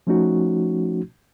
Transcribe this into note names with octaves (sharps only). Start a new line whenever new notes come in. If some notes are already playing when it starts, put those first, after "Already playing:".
F3 A3 C#4 D#4 F#4